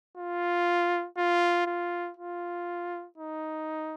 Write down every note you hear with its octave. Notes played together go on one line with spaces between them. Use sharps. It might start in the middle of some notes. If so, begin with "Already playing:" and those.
F4
F4
F4
F4
D#4